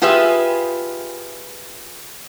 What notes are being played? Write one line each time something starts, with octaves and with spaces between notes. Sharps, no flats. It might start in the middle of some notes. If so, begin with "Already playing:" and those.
F4 G4 G#4 B4 E5